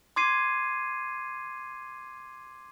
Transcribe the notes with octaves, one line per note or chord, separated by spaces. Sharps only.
C6 D6 G#6 C7 D#7